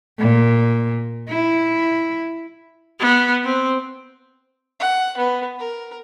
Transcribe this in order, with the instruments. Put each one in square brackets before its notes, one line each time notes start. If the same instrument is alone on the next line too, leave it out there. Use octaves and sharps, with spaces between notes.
[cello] A#2
E4
[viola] B3
C4
[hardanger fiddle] F#5
B3
A#4